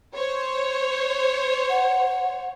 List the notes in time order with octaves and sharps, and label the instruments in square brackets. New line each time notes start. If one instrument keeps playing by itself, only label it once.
[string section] C5 C#5
[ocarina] F#5